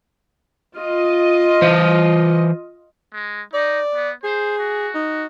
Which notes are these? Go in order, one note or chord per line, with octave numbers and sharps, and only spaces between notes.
F4 D#5
E3 C5
G#3
D#4 D5
B3
G#4 C5
F#4
D#4